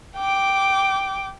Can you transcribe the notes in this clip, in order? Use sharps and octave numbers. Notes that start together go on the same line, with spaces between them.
G5 D6